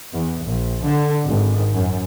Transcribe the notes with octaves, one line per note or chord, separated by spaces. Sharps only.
E2
A#1
D3
G#1
F#2